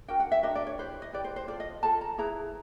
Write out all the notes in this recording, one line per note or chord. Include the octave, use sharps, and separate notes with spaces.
D4 F#4 A#4 G5
F#5
E5
D4 F#4 A#4 D#5
D5
C#5
E4 G4 B4 C5
D#5
E4 G4 B4 D5
C5
C5
F4 A4 D5
D#5
F4 A4 A5
A#5
E4 G#4 B4 A#5